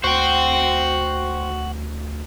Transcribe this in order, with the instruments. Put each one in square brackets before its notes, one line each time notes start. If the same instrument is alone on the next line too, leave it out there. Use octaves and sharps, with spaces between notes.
[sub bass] D2 [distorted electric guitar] F#4 [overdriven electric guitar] C5 G5